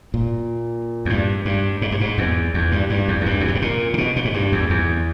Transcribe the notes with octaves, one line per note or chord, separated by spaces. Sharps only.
A#2
E2
G2
G2
G#2
G2
G#2
E2
E2
G2
G2
E2
E2
G2
E2
G2
G#2
A#2
C#3
B2
A#2
G#2
G2
E2
E2